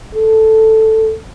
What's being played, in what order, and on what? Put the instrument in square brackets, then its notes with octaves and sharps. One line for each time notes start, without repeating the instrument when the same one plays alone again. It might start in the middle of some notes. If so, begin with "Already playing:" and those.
[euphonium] A4